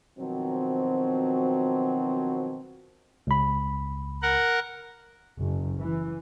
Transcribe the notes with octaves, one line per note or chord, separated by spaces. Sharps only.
B2 D#3 F3 F#3 C4
C#2 B5
A#4 F#5
F#1
E3